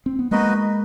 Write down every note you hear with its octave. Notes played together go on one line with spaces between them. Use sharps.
C4
B3
G#3 A#3 D#4 F#4 B4 D#5